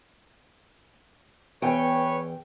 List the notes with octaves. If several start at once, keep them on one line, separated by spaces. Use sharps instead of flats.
E2 B4 C#5 G5 C#6